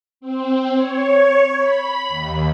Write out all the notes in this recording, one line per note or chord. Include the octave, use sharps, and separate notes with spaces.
C4
C#5
B5
D#2